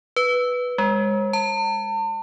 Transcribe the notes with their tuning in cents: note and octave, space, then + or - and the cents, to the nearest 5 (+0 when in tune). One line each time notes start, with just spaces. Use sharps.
B4 -5
G#3 -30
A5 +40